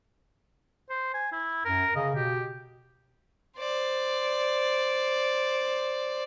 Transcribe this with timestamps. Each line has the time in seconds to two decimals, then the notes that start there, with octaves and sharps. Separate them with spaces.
0.90 C5
1.14 G#5
1.32 E4
1.65 F#2 A#4
1.96 C#3 D#5
2.15 B2 G4
3.58 C5 D5